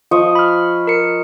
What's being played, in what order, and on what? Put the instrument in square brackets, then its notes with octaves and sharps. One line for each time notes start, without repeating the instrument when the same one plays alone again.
[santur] F3 D#5 C#6
[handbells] B5 F6
A#4 C#7